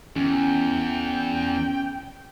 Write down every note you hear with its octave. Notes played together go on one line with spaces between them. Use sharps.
E2 C#4 G5